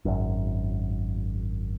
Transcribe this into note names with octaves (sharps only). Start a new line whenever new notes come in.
G#1 F#2